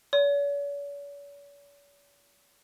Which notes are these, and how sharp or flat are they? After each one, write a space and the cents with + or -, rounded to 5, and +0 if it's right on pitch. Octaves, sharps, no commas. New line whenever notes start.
C#5 +45